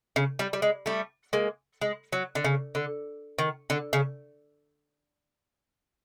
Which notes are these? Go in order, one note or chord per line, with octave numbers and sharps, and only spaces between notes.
C#3
G3
G3
G#3
G3 A3
G#3 A#3
G#3
F#3
D3
C#3
D3
D#3
D3
C#3